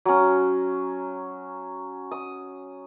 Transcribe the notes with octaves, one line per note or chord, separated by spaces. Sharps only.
F#3 C#4
D#6